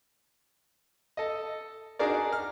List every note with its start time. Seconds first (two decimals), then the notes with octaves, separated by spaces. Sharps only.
1.17 A4 D#5
1.99 D4 D#4 F#4 G#4 A#4 D5
2.33 F6